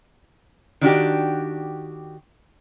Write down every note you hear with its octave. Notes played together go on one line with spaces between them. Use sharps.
D#3 D4 F#4 G4